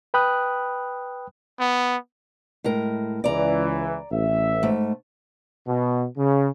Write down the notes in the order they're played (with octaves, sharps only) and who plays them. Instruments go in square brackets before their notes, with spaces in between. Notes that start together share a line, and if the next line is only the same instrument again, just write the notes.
[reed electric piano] B4 G5 B5 D#6 F#6
[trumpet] B3
[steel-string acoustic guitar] A2 G#3 A#4
[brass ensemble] C#2 E3 [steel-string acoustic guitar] D5 A#5
[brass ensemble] A1 E5
[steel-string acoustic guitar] G#2 A3
[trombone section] B2
C#3